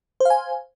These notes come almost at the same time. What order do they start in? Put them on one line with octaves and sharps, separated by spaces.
C5 F5 G#5